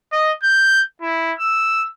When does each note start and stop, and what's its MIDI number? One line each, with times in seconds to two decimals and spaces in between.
0.13 0.31 75
0.43 0.82 91
1.02 1.32 64
1.39 1.87 88